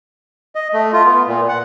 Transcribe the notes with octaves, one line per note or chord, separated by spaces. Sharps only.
D#5
A3
F4
B3
A#2
F#5